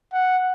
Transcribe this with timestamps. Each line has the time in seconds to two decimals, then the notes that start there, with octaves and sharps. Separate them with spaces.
0.13 F#5